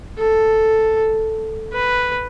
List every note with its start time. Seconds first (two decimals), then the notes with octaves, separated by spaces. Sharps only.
0.18 A4
1.73 B4